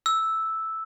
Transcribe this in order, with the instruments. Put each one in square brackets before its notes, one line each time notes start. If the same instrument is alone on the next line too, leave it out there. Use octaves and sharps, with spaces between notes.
[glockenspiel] E6